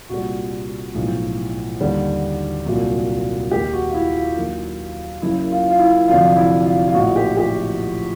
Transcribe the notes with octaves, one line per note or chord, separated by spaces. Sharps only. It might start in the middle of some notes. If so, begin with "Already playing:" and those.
C2 A#2 G3 F#4
B1 A2 F3 G#3
D#2 D3 G3
C2 A#2 F#3
D#2 D#3 G#3 G4
F#4
F4
E4
F4
D#2 D#3 F#3
F#1 F#2 C#3 E4
F4
F4
E4
F1 F2 D3 F#3 F4
E4
F4
F4
A#1 A2 F3 G#3 F#4
G4
G4